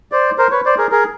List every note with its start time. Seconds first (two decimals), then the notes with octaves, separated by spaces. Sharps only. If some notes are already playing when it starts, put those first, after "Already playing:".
0.12 C5 D5
0.38 A#4 C5
0.51 B4 C#5
0.65 C5 D5
0.78 G#4 A#4
0.91 G#4 A#4